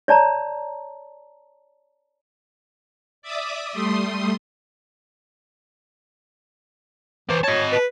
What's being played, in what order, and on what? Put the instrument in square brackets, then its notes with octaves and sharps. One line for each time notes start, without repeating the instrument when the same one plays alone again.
[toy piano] C#5 D5 A5 A#5
[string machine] D5 E5 D6 D#6
G3 A3 C6 D#6
[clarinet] E3 [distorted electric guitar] C5 D5
[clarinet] C#5 [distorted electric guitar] D#5 A5
[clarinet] B4